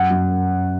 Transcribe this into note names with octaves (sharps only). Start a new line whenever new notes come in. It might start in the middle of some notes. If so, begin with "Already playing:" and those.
Already playing: F#2 F#5
F#2